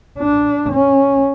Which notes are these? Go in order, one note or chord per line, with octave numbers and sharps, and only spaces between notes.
D4
C#4